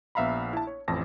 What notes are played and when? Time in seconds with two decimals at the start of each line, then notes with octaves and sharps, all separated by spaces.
0.15 A#1 B3 E5 F5 A#5 B5
0.53 E4 A5
0.67 C#5
0.88 A1 F2 E3 A5 A#6